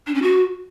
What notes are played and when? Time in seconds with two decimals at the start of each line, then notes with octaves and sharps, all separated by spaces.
0.07 D4
0.15 C#4
0.22 F#4